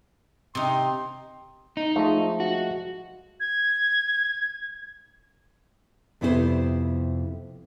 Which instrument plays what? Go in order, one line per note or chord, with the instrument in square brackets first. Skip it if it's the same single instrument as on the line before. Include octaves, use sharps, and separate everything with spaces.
[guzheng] C3 D#4 [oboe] C6
[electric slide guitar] D#4
[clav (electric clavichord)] F3 G#3 A3
[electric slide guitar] F#4
[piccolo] G#6
[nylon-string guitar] F2 C3 B3 E4 F#4 C5